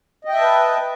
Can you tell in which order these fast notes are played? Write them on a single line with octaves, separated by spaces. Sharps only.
D#5 G5 E5 A5 B4